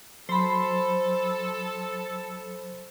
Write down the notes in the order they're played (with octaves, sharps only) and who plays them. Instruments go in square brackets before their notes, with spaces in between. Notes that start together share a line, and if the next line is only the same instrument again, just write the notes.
[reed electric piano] F#3 C6 [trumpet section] A4 [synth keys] C5 B5